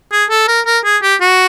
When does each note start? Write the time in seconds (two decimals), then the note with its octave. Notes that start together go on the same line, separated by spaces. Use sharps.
0.12 G#4
0.30 A4
0.48 A#4
0.66 A#4
0.85 G#4
1.03 G4
1.21 F#4